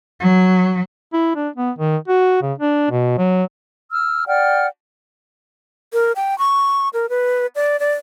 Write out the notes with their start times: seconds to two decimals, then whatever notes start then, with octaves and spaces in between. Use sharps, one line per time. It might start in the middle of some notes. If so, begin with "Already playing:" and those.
0.20 F#3
1.13 E4
1.36 D4
1.56 B3
1.78 D#3
2.08 F#4
2.42 C#3
2.58 D4
2.90 B2
3.18 F#3
3.91 E6 F6
4.27 D5 F#5 G5 F6
5.93 A#4
6.16 G5
6.39 C#6
6.93 A#4
7.09 B4
7.55 D5
7.80 D5